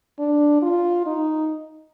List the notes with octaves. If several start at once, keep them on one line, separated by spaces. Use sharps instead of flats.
D4
F4
D#4